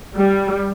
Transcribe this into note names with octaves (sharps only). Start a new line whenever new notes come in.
G3